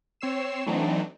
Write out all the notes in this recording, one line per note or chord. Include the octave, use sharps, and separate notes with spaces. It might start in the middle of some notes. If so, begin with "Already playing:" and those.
C4 C#5 E6 C7 E7
E3 F#3 A3 C4 D4 D#4